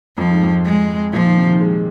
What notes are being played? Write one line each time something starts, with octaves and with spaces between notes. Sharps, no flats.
F2 F3
G#2
F2
G#3
A#2 F3
D#3
C3
D#3
G#3